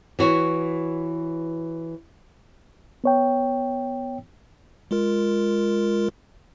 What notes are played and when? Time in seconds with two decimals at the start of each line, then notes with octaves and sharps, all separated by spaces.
0.19 E3 F#4 C#5
3.04 B3 C#5 G5
4.91 G#3 F4 A#4